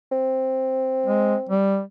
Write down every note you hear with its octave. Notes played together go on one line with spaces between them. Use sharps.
C4
G#3
G3